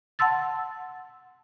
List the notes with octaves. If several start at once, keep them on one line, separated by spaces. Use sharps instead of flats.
F#5 A5 C6 E6 A6